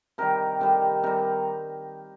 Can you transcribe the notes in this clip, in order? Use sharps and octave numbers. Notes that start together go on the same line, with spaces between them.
C3 D#3 G3 A#4
C3 D#3 G3
C3 G3 A#4